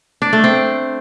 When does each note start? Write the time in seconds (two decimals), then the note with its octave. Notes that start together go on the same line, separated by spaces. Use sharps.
0.22 D4
0.33 A3
0.44 C4